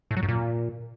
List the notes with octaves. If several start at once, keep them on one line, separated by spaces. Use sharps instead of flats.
A2
F#3
F#2
A#2